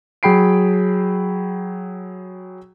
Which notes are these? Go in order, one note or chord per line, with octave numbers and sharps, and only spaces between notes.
F#3 G#4 G5 B5 C7 D7